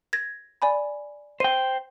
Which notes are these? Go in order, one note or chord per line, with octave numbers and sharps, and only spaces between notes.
G#6 A#6
D5 G#5 B5
C5 G5 D#7